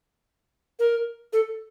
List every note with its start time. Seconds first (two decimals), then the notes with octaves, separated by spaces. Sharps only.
0.79 A#4
1.33 A4